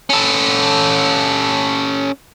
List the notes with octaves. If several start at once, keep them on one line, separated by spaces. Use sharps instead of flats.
C#4 A4